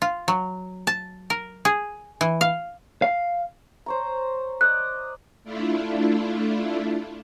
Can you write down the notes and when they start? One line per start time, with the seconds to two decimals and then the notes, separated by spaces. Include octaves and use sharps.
0.02 F4
0.28 F#3
0.87 A5
1.30 A#4
1.65 G#4
2.21 E3
2.41 F5
3.02 F5
3.86 C5 C#5 A#5
4.61 D5 D#5 D#6 F#6
5.44 A3 D4 E4 F4